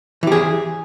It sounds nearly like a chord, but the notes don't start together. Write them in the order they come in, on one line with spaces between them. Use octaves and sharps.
E3 G4 G#4